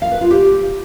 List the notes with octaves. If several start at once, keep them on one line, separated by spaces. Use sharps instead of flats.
F5
B4
F4
G4